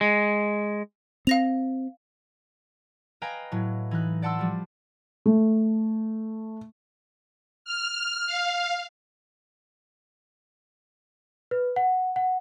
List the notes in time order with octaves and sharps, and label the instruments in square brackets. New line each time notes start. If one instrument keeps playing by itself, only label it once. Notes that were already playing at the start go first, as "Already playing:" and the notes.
[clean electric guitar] G#3
[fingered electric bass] C4 [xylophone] F5 A#6 F7
[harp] B4 D#5 F5 G5 G#5 A#5
A2 F#3
E3 D#4 F#6
D5 F#5 A5 C6 E6
F3 G3
[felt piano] A3
[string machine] F6
F5
[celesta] B4
F#5
F#5